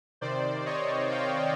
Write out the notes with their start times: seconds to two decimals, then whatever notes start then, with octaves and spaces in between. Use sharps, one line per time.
0.21 C3 D#3 C5 D5
0.66 C#5 D#5
1.11 F5 G5